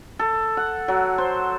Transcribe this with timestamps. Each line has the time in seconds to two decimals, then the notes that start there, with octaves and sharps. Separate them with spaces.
0.19 A4
0.57 F#5
0.88 F#3
1.18 C5